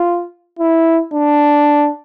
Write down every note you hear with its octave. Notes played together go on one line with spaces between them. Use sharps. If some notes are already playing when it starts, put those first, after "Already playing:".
Already playing: F4
E4
D4